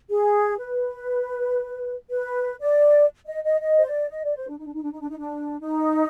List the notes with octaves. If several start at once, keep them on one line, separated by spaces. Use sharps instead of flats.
G#4
B4
B4
D5
D#5
D#5
D#5
C5
D5
D#5
D5
C5
D4
D#4
D4
D#4
D4
D#4
D4
D#4
D4
D#4